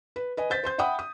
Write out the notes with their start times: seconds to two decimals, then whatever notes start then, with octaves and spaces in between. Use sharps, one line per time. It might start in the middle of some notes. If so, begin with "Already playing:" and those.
0.16 B4
0.37 B4 D#5 G#5
0.50 C5 G6 A6 B6
0.64 C5 C6 G6
0.78 E5 F#5 G5 B5 D#6
0.99 D#6